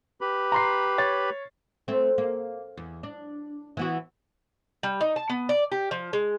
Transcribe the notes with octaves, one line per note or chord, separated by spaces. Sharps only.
G4 B4 B5
A#5 C6 C7
C#5 A6
A3 C4
A#3
E2
D4
E3 B3 F#4
G3
D#4
A5
B3
D5
G4
F3
G#3